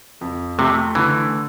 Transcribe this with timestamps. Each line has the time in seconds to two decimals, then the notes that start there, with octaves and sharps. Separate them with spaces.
0.21 F2
0.58 C3 A3
0.95 D3 E3